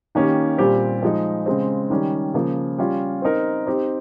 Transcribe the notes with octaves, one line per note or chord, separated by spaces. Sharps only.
D#3 A#3 C#4 G4
A#2 G3 C4 G4
F3 G#3 D#4
C#3 G#3 C4
D#3 G3 C#4
C#3 F3 A#3
G3 C#4 F4
C4 D#4 A#4
C4 D#4 G4